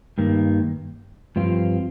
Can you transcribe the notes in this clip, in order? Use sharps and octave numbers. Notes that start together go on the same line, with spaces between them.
G2 D#3 A#3
G2 F3 C4 F4